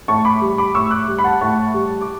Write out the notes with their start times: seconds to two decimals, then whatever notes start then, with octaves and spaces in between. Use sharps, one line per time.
0.08 A2 A5 C#6
0.25 B5 D6
0.41 G3
0.58 B5 D6
0.75 A2 C#6 E6
0.91 D6 F#6
1.08 G3
1.19 B5
1.24 F#5 A5
1.41 A2 A5 C#6
1.74 G3
2.01 D6